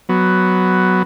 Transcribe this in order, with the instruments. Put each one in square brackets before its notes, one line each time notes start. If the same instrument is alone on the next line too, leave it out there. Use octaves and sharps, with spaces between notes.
[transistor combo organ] F#3 B3